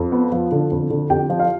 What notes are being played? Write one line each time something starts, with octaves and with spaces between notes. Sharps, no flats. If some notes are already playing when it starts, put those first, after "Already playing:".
Already playing: F2
B3
F3
D3
F2
D3
F2 G4 G5
F3
F4 F5